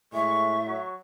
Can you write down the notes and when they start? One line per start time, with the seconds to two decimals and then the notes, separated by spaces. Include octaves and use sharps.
0.13 A2 G#3 E5 C#6
0.66 F#3